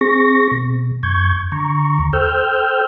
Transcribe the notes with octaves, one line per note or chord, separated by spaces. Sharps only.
C4 G#4 C#6 A#6
B2
F#2 C#6 G6 G#6
D3 A#5 C#6
D#2
A4 C5 G5 E6 F6 G6